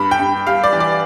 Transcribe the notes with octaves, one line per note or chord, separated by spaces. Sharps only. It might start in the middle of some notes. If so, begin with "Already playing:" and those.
Already playing: G2 B5
G5
G2
G3 F5
D5
E3
D5